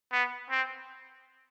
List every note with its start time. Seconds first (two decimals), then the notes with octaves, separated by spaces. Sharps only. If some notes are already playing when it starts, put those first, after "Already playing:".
0.12 B3
0.50 C4